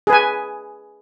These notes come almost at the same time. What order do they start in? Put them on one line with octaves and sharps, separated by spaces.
G#4 B4 G#5